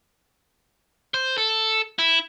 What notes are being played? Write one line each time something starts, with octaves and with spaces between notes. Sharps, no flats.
C5
A4
E4